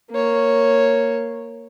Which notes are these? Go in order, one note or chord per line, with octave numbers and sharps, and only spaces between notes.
A#3 C#5